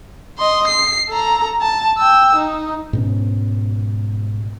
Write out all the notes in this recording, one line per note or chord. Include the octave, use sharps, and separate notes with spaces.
D#5 C6
C7
A4 A#5
A5
G5 E6
D#4
G#2 B2 C#4